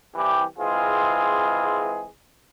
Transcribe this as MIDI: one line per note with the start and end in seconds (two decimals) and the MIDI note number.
0.16 0.43 36
0.16 0.43 52
0.16 0.43 67
0.59 2.05 52
0.59 2.05 56
0.59 2.05 60
0.59 2.05 65
0.59 2.05 68